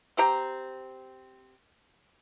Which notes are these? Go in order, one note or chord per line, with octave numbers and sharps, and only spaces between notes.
C4 G4 A#5